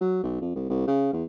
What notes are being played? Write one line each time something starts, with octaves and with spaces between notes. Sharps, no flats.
F#3
B1
F2
C2
C2
C#3
E2